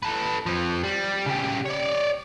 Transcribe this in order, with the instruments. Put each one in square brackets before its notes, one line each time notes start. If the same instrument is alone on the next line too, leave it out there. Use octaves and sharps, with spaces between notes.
[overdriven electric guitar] A4 B4
F3 C4
G3
C#3 G4
C#5 D5